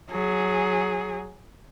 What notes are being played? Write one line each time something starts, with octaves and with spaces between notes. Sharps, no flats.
F#3 G#4